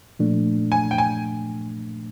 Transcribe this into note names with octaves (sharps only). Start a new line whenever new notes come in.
A#2 F3 A3 D4
G#5
G5
G#5